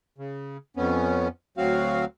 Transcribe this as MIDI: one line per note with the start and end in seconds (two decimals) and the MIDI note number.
0.18 0.57 49
0.77 1.28 41
0.77 1.28 59
0.77 1.28 61
1.58 2.05 38
1.58 2.05 54
1.58 2.05 60
1.58 2.05 66
1.58 2.05 77